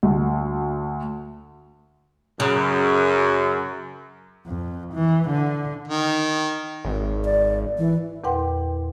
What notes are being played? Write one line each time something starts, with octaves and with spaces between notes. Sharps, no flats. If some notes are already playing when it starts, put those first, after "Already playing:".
D2
F#2 C#3
F2
E3
D3
D#3
G#1
D5
E3
E2 A#2 B4 F#5 G5 C6